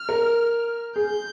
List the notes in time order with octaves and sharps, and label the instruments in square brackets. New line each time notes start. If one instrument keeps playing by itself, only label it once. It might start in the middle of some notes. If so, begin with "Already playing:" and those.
Already playing: [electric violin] F6
[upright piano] A#4
[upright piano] G#4 [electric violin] G6